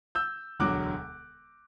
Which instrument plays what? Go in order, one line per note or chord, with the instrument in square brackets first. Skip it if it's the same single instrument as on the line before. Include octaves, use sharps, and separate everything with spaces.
[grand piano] E6 G6
E1 D2 D3 F#3 D6 F#6